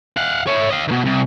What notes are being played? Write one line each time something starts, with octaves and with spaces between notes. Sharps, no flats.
F5 F#5
C#5 E5
D#5 F5
B2 D#3
C2